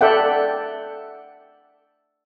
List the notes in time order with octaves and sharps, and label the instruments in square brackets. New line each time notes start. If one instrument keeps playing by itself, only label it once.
[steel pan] A4 D5 E5 F#5 G5